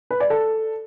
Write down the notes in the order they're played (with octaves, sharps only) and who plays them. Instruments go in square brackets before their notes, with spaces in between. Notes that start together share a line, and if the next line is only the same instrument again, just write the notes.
[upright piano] B4
D5
A4